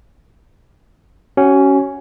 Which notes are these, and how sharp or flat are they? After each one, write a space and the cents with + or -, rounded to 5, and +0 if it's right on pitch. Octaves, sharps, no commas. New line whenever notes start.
C#4 +0 F#4 +30